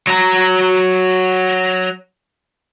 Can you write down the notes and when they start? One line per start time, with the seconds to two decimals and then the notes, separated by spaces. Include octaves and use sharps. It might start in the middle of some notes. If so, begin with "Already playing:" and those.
0.07 F#3 A#5